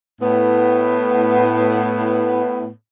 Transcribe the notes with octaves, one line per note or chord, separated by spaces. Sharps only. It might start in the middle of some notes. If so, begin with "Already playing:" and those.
A2 B3